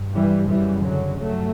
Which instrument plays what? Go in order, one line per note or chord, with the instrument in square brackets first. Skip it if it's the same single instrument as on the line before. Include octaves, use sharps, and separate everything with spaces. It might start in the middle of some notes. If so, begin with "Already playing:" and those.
Already playing: [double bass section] G2
E3 G3
F#2 C#3 E3 G3
D3 F#3
G2 F#3 A3